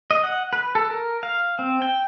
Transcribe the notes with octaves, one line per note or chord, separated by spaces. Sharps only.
D#5
F#5
B4
A4
A#4
F5
C4
G5